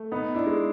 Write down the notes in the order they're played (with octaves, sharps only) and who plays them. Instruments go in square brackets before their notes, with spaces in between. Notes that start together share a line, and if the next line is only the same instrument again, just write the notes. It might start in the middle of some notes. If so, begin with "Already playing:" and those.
Already playing: [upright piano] A3
[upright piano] B3 [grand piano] D#4
[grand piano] D4 E4
[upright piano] G#3